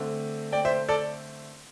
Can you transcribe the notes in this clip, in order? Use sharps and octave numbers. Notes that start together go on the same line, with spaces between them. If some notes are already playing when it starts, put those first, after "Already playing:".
Already playing: D3 A3 C4
D5 G5
C5 E5
A4 D5